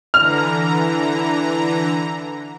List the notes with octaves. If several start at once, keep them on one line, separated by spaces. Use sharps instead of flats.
D3 E3 A#5 F6